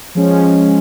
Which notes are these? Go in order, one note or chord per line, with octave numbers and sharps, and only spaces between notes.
F3 G#3 C#4